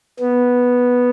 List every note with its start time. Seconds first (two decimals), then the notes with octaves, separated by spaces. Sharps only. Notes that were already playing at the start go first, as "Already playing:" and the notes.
0.20 B3